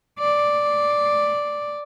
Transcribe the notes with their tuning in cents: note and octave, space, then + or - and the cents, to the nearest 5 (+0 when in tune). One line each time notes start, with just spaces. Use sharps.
D5 +0